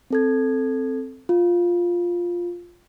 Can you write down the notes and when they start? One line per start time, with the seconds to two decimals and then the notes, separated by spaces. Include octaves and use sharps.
0.10 C4 A4 G#6
1.29 F4